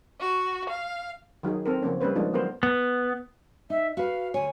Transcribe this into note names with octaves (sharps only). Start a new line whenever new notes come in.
F#4
F5
D#3 F#3 D#4 G#4
C4 A4 A#4
C#3 F3 A#3 C#4
G3 A#3 C#4 B4 C5
F3 G#3 A#3 D4 D#4 F4
D#3 F#3 B3 A#4 C5
B3
D#4 E5
F#4 B4 F5
D2 C#5 G#5